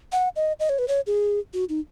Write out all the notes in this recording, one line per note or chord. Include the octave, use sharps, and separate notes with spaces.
F#5
D#5
D#5
C#5
B4
C#5
G#4
F#4
D#4